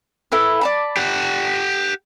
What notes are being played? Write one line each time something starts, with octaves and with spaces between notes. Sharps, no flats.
E4 A4 B4
D5 A5 B5
G4 F#5